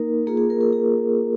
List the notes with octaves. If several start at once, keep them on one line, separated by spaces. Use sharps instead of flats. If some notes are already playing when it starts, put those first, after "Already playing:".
Already playing: A#3 D#4 A#4
A#3 F4 G#4
G#4
A#4
A#4
G#4